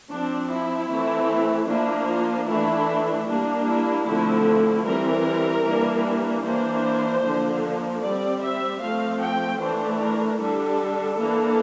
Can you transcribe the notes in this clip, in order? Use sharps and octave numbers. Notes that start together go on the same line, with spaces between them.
F3 C4 D4
E4
E3 A3 C4
F3 A#3 D4 E4
F4
E3 A3 D4 E4
G3 A#3 D4
E4
D3 F3 A3 C4 E4
E3 G3 C4 A#4
E3 G3 A#3 D4
E3 A#3 D4 C5
D3 F3 A#3 D4
G3 C4 D5
E5
F3 A3 C4 F5
G5
E3 A3 D4 C5
A#4
D3 G3 D4 A4
E3 A#3 D4